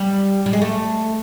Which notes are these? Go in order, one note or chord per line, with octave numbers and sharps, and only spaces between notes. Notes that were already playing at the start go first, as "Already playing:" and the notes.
Already playing: G3
G3
G#3
A3